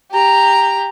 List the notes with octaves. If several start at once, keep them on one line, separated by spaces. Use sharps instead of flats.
G4 A#5